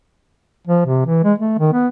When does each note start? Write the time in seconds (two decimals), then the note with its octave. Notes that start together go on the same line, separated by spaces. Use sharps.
0.67 F3
0.86 C3
1.06 E3
1.24 G#3
1.38 A3
1.58 D#3
1.73 B3